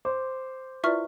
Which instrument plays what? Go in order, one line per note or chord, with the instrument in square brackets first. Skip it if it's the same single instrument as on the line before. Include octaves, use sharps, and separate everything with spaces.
[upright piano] C5 [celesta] C6 D6
[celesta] E4 [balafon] F4 B4 D5 [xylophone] E5 C#6 F6